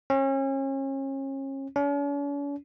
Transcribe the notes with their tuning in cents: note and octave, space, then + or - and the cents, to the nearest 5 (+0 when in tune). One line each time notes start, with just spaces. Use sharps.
C#4 -35
C#4 +45